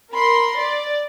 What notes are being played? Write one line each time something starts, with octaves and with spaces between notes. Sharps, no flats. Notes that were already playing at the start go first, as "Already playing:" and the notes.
A#4 B5 C6
D5